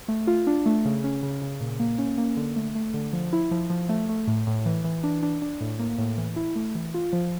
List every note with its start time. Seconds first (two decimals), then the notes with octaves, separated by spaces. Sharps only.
0.08 A3
0.27 F4
0.47 D4
0.66 A3
0.85 C#3
1.04 C#4
1.23 C#3
1.41 C#3
1.61 A#2
1.79 A#3
1.98 C#4
2.18 A#3
2.37 D3
2.56 A3
2.75 A3
2.94 D3
3.13 F3
3.33 E4
3.51 F3
3.70 F3
3.89 A3
4.09 A3
4.27 A2
4.47 A2
4.66 E3
4.84 E3
5.04 D4
5.23 D4
5.42 D4
5.60 A2
5.79 A#3
5.98 A2
6.18 E3
6.36 E4
6.56 A3
6.75 E3
6.94 F4
7.13 F3